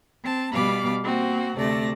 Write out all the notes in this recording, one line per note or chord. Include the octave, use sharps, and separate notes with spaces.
C4 A5
B2 G3 B3 F5 B5 D6
A#3 C4 F#4
D2 C3 A3 D5 A#6